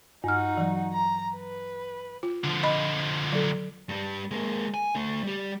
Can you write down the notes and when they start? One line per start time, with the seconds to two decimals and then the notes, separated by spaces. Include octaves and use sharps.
0.24 G2 D#4 F#4 F6
0.57 E3 F#3
0.93 A#5
1.36 B4
2.23 F4
2.44 D3 F3
2.63 D#5 B5
3.32 F#3 A4
3.89 G2 G3
4.31 G#3 A#3
4.74 G#5
4.95 D3 A3
5.23 G3 G4